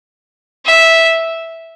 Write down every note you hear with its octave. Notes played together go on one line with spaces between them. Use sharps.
E5